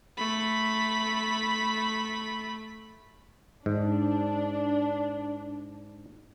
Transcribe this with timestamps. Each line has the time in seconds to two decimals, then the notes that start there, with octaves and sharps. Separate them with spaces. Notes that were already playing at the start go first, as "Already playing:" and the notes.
0.18 A3 B5
3.66 G#2 D4